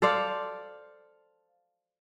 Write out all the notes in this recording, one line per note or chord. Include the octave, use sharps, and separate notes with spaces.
A4 C5 D5 F5